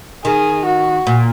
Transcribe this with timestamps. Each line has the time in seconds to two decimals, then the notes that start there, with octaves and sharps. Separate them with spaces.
0.24 D#3 G#4
0.66 F#4
1.07 A#2